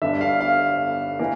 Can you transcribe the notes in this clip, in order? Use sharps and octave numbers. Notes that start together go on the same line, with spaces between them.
G1 G2 D3 E5
F5
F5
E3 A#3